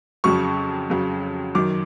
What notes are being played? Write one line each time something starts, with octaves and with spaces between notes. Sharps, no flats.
F2 C#3 F#3 C#6
F2 C#3 F#3
F#2 D#3 F#3 D6